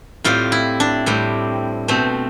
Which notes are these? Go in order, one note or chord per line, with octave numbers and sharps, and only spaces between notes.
A2 G3 C4 F4
E4
D4
A2 G3 C4
B2 A3 C4